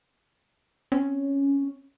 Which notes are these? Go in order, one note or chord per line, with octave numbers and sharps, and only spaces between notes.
C4 C#4